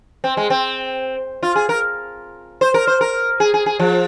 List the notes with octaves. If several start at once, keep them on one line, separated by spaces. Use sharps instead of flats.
C4
G#3
C4
F4
G#4
A#4
C5
A#4
C5
A#4
G#4
G#4
G#4
F3